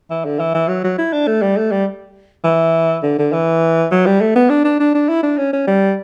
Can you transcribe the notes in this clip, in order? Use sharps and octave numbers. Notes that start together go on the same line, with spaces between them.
E3
D3
E3
E3
F#3
F#3
E4
D4
A3
G3
A3
G3
E3
D3
D3
E3
F#3
G3
A3
B3
D4
D4
D4
D4
E4
D4
C#4
C#4
G3